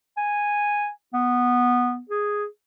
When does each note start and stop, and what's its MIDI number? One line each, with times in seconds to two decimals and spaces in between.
0.17 0.90 80
1.14 2.00 59
2.09 2.45 68